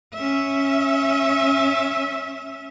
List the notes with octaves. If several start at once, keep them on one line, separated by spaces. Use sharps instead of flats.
C#4 E5